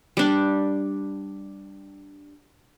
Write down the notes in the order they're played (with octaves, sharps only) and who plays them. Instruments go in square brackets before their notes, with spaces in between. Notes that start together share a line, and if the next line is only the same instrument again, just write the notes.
[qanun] G3 D4